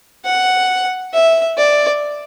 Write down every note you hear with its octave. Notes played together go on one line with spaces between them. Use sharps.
F#5
E5
D5